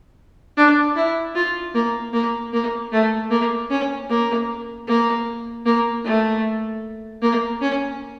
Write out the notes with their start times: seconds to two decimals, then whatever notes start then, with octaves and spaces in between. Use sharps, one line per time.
0.57 D4
0.96 E4
1.35 F4
1.74 A#3
2.13 A#3
2.53 A#3
2.92 A3
3.31 A#3
3.70 C#4
4.10 A#3
4.88 A#3
5.65 A#3
6.04 A3
7.22 A#3
7.61 C#4